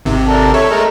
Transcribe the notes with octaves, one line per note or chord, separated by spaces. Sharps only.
G#1 C3
D4 A4 A#4
A4 C#5 E5
G#3 A3 A#4